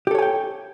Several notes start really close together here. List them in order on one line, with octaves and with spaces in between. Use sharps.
G4 A4 C#5 G#5 G5